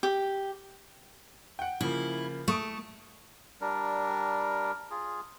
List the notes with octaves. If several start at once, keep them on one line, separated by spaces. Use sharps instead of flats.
G4
F#5 G5
C#3 F3 A#3 E4
A3 C#6 D#6 D7
G3 D4 A#4
F4 G#4